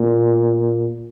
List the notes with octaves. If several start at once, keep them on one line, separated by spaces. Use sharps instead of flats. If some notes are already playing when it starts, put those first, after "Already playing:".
Already playing: A#2